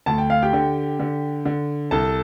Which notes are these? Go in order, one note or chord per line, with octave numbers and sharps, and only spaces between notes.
D2 A5
G5
F5
G4 G5
D3
D3
D3
C2 A4 A5